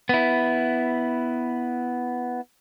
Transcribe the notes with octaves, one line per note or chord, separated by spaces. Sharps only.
B3 E4